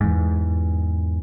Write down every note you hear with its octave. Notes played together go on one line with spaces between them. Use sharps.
E2 G#2